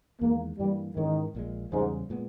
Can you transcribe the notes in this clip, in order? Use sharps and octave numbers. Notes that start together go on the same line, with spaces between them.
E2 D#3 G#3 A#3
G2 E3 G3 A#3
G#2 D#3 E3 G#3 C#4
A#1 A#2 G#3
E2 G#2 C#3 G3
A#2 G#3 B3